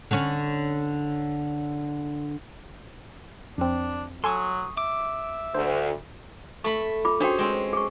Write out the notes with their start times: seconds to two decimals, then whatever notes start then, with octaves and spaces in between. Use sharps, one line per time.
0.11 D3 C#4
3.58 F2 C4 D4
4.24 F#3 A4 G#5 C6 C#6 D#6 E6
4.77 E5 D6
5.54 D2 C5
6.64 A3 B5 C#6
7.05 F4 B5 D6
7.20 C#4 D4 F#4 G#4 C5 G5
7.38 G#3 C4 C#4
7.73 G#4 C#6